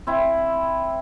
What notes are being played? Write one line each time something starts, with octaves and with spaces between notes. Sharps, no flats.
C4 E4